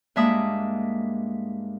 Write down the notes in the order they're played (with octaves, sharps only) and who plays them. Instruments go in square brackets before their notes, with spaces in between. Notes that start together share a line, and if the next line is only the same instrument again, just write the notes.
[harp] G2 G#3 A#3 E5 A5 D#6